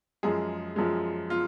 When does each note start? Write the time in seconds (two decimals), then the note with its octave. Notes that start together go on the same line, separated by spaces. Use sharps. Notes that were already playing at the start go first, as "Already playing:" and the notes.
0.23 F#2 F3 G#3 G#4
0.76 F#2 F3 G#3
1.30 F4